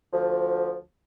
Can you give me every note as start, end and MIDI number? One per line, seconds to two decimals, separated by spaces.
0.13 0.78 38
0.13 0.78 53